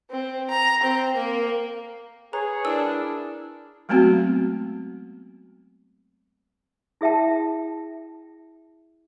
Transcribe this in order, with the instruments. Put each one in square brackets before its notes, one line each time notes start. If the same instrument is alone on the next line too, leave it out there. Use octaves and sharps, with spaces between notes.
[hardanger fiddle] C4
A#5
C4
A#3
[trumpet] G#4 [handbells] B4 [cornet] C#5 [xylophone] A#5
[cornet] D4 [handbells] E4 A#4 [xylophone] E6
[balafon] F#3 G#3 A3 B3 C4 F#4
[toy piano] E4 G#4 E5 G5 A5